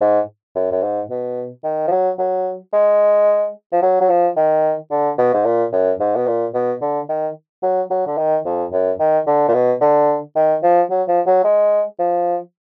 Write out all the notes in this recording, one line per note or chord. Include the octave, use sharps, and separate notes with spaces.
G#2
F#2
F#2
G#2
B2
D#3
F3
F#3
F#3
G#3
F3
F#3
F#3
F3
D#3
D3
B2
G#2
A#2
F#2
G#2
B2
A#2
B2
D3
D#3
F#3
F#3
D3
D#3
F2
F#2
D#3
D3
A#2
B2
D3
D#3
F3
F#3
F3
F#3
G#3
F3